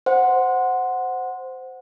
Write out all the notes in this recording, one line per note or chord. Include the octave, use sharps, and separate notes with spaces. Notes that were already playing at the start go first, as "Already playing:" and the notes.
C5 F#5